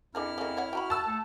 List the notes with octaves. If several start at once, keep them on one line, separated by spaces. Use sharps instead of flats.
F2 D4 E4 G#4 A#4 F6
F2 C#3 A#3
C#5 E5 F#5
F#4 G5 A#5 B5
A5 E6
A3